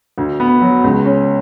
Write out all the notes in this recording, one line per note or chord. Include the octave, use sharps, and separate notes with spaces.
D2
B3
F#3
C#2
C#4